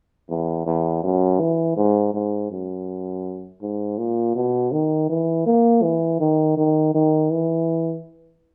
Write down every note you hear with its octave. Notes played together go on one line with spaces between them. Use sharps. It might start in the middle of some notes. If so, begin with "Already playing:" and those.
E2
E2
F#2
E3
G#2
G#2
F#2
G#2
A#2
B2
D#3
E3
A#3
E3
D#3
D#3
D#3
E3